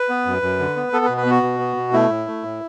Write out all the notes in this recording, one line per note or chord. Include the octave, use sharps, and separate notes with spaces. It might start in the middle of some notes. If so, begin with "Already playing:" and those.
Already playing: B4
B3
F#2
F#2
D3
B3
B3 A4
B4
B2
B4
B3 F#4
B2
B3
B2
A3 E4
A2
A3
A2